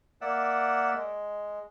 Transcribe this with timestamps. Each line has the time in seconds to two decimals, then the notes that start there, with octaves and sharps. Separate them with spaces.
0.21 A#3 D5 E5 F#5
0.93 G#3